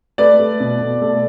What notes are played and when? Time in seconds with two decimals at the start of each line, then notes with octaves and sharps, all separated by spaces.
0.18 A3 B4 D5
0.40 A3
0.60 B2
0.81 B2
1.01 A3